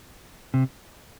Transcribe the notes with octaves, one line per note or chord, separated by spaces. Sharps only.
C3